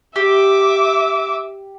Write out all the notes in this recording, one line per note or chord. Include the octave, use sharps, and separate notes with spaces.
G4 E5 D6